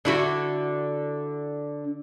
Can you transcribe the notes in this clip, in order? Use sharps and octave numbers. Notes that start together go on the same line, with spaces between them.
D3 E4 F#4